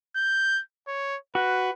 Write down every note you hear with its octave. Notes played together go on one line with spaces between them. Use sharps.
G6
C#5
F#4 B4